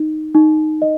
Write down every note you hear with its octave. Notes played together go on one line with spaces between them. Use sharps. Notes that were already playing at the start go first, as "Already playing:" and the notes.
Already playing: D#4
D#4
D#5